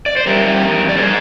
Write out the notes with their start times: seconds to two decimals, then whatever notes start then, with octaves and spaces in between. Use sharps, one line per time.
0.06 D5
0.17 C5
0.27 G3 G4 A#4
0.44 G3
0.61 F2
0.79 F2
0.89 D5
0.96 G3 G#4 C5